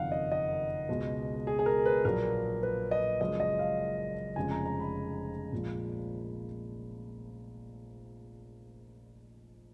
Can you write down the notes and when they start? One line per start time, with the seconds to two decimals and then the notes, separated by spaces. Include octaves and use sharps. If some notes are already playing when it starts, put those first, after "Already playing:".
Already playing: F#1 F2 D#3 F5 F#5
0.12 D#5
0.32 D#5
0.89 C#2 B2 G#3
1.47 G#4
1.59 G#4
1.66 A#4
1.86 B4
2.05 A#1 A#2 F#3 A#4
2.63 B4
2.91 D#5
3.21 F#1 F#2 F3 G#3 D#5
3.40 D#5
3.59 F5
4.36 F1 F2 C#3 F3 G#3 G#5
4.51 A#5
4.66 A#5
4.80 B5
5.52 A#1 A#2 F3 G#3